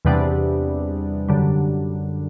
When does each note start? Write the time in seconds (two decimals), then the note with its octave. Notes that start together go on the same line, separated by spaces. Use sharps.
0.05 E2 C3 G3 B3 D4
1.29 F#2 D3 G3